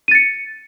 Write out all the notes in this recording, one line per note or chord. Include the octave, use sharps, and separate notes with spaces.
A6 C#7 D#7